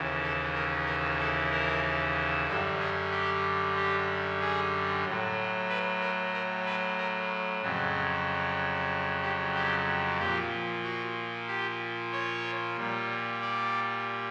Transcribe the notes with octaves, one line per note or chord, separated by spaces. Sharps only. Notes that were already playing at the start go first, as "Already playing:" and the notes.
Already playing: D#2 C#3 E3
A4
A#4
A#4
A4
A#4
F#2 D3 G3 A4
G#4
G4
G4
G#4
A2 F#3
B4
A#4
A#4
B4
A#4
F2 C#3 F#3
G4
G4
A#2 F3 G4
F#4
G4
C#5
A#2 G3
D5